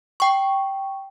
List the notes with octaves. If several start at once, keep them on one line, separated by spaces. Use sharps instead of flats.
G5 C#6